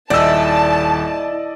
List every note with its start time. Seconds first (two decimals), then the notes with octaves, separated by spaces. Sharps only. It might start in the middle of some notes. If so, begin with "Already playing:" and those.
0.10 D#1 E4 D5 D#5 A5 E6